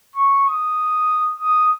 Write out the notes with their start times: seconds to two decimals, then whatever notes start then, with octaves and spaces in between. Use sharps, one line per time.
0.16 C#6
0.47 D#6
1.40 D#6